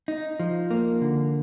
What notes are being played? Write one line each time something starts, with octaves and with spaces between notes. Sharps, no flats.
D#4
F3
A#3
D3